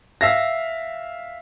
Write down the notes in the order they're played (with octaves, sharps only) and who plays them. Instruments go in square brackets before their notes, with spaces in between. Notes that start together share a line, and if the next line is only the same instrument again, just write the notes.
[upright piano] E5 F5 A#6